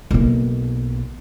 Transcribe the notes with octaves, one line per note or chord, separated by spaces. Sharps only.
B1 A#3